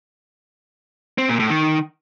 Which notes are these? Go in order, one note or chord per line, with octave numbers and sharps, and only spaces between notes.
C4
A#2
A2
D#3